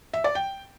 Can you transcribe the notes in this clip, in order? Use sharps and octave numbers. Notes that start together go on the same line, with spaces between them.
E5
D5
G5